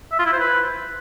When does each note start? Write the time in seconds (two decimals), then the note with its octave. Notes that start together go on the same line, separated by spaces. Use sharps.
0.12 E5
0.19 F4
0.26 E4
0.33 C5
0.40 B4